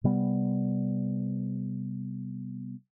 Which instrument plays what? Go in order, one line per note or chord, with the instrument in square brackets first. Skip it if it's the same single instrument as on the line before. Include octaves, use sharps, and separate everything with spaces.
[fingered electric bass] C3 G3 B3